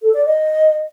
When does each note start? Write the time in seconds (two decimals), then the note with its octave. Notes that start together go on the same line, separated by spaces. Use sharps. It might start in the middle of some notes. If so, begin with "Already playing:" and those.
0.02 A4
0.14 D5
0.25 D#5